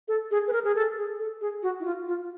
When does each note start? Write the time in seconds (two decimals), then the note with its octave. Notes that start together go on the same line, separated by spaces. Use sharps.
0.08 A4
0.31 G#4
0.48 B4
0.53 A#4
0.64 G#4
0.75 A4
0.97 G#4
1.19 A4
1.41 G#4
1.63 F#4
1.80 E4
1.85 F4
2.07 F4